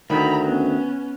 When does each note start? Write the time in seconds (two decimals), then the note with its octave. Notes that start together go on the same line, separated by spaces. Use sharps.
0.10 D2 D#3 A#5 B5
0.46 B3 C#4